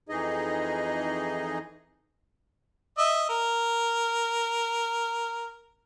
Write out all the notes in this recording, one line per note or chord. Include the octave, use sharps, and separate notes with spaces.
F2 E3 D#4 G#4 D#5
D#5 E5
A#4